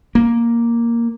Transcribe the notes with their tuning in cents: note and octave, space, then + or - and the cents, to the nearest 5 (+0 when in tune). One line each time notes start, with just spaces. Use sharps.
A#3 +0